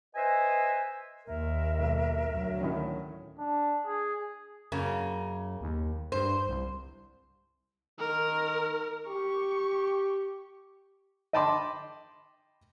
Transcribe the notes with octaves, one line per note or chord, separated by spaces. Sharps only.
B4 C5 D#5 E5 G#5
D#2 A#4 E5
B1
D2 F#3
A2 D#3 C#4
D4
G#4
F#2 C#3 A#3
D#2
G2 C5
C2
D#3 A#4
G4 C#6
D#5 G5 A5 B5 C6 D6